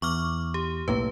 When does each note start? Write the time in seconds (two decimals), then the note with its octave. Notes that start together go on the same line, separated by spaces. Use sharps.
0.02 E2 C#6 D6 F6
0.54 G4
0.88 B1 A2 A#3 B4